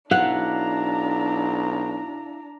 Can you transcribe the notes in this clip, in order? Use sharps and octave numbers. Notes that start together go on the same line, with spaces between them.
B1 D4 E4 F5 F#5 A#5